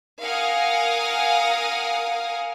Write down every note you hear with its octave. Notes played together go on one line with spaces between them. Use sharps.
A#4 F5 F#5 G#5 D#6